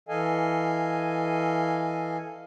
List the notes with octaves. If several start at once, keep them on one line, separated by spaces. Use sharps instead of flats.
E3 A4 D#5 F5 G#5